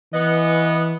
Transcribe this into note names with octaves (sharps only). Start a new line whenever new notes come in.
E3 B3 D#5